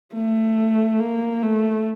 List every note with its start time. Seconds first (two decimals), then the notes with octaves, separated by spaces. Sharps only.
0.14 A3
1.00 A#3
1.42 A3